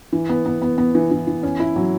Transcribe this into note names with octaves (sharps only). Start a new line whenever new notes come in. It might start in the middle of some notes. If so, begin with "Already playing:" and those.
E3
B3
B3
B3
B3
E3
E3
E3
C#4
E4
F#3